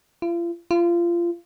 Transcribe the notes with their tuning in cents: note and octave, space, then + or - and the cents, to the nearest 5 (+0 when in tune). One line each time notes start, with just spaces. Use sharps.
F4 -40
F4 -25